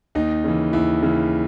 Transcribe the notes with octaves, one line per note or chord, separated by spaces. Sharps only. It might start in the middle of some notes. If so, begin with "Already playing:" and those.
D#2 D#4
C#3 E3
D#2 E4
C#3 E3